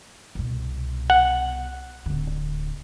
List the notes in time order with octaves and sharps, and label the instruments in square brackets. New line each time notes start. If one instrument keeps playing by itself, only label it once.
[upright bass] C2 B2
[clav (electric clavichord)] F#5
[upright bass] D1 D3